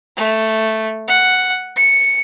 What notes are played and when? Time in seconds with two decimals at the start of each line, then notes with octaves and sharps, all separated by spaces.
0.17 A3
1.08 F#5
1.76 C#7